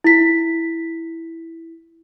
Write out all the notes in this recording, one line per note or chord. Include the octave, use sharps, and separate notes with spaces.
E4 B6